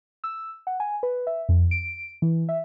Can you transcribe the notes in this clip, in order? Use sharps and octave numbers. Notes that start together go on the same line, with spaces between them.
E6
F#5
G#5
B4
E5
F2
D7
E3
E5